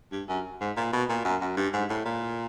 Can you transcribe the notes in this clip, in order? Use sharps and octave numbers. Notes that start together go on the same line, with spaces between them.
G2
F#2
G#2
A#2
B2
A#2
F#2
F#2
G2
G#2
A2
A#2